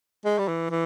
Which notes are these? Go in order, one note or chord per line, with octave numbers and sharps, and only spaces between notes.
G#3
G3
E3
E3